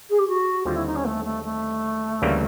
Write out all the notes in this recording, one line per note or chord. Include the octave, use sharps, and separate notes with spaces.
G#4
G4
F#4
D#2 D3 G3 C4 F4
E4
D#4
C#4
A3
A3
A3
D2 C#3 E3 G3 A#3